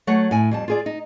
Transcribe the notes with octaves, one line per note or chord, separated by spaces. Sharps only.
F#3 A3 C#5 F#5
A2 G#5
F2 G3 A5
F4 G#4 D5
D#4